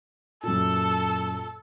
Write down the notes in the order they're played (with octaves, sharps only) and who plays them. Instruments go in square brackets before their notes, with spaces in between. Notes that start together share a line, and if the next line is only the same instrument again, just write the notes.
[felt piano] F#2 A#2 [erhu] A4